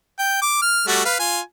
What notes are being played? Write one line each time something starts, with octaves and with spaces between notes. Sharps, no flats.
G5
D6
F6
G3 A3 F#4
B4 F5
F4 G#5